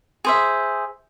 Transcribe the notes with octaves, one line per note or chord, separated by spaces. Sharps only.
G#4 C5 E5